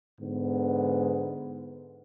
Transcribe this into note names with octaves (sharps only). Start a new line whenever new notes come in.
G#2 D3 B3